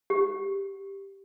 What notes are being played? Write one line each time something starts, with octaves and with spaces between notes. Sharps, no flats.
G4